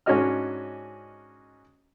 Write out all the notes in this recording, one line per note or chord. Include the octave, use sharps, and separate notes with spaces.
G#2 C#4 D4 F#4 D#5 F6